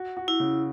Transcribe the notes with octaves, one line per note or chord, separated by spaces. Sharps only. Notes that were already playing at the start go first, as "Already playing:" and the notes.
Already playing: F#4
F#4
E4
C#3